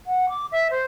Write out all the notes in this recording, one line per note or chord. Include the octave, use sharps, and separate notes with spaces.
F#5
D6
E5
C5